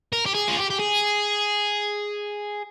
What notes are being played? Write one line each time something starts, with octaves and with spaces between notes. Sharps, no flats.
A#4
G4
G#4
F4
G4
G4
G#4